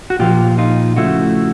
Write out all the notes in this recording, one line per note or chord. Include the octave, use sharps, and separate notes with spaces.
F#4
A#2 F3 A#3 F4 G4
D#4 F4
C#3 F3 A3 E4 F#4